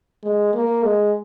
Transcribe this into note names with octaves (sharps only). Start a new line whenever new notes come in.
G#3
A#3
G#3